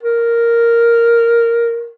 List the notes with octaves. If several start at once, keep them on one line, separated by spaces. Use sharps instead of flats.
A#4